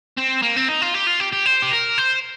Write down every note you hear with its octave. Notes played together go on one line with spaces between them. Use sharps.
C4
A#3
C4
D#4
F4
G4
F4
G4
G4
C5
G4
A#4
C5